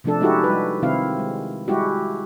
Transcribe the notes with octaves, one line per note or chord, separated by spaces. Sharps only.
C3 F3 A3 D4 A4
G#3 D#4 E4 F#4 G4 A4
G3 B4
C3 D#3 C4 E4 F5
G#3
G3 G#3 E4 F#4 G4